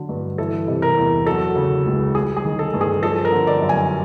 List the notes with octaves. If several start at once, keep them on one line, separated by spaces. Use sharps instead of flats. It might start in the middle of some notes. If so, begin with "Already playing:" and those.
Already playing: D3 F#3
G2
E3 A4
C3
A#4
E2
F#3 A4
C#3
C#2
G3 G#4
G#4
D#3
A4
G2
G#4
F3 A4
A#4
D3
D5
F#2
G#5